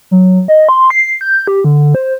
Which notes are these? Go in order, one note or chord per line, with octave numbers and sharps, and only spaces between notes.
F#3
D#5
C6
C7
G6
G4
D3
C5